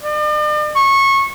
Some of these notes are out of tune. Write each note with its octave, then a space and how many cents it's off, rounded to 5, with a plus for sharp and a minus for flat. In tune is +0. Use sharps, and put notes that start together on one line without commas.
D5 +45
C#6 -20